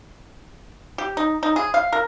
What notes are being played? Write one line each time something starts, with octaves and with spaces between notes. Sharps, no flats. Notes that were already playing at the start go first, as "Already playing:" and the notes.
G4
D#4
D#4
G#4
F5
A#4